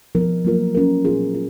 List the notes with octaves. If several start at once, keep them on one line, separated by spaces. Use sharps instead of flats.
F3 B3 D#4 A#4
F#3 A#3 F4 A#4
F#3 C#4 F4 A#4
A#2 F#3 B3 F4 G#4
F4 G#4